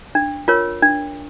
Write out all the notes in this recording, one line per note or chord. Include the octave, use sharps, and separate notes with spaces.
D4
F4 A#4 C#5
D4